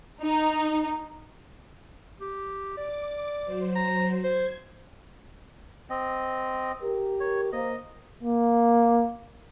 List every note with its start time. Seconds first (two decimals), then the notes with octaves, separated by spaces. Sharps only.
0.22 D#4
2.21 G4
2.78 D5 D6
3.45 F#3 C5
3.76 A#5
4.24 C5 G#6
5.90 C4 D#5
6.82 G4 A#4
7.20 C#5
7.52 A#3 C5 D#5
8.23 A#3